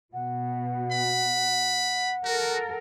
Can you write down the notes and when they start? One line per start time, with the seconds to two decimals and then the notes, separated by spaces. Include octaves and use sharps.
0.14 B2 F#5
0.92 B5
2.25 F#4 A4 A#4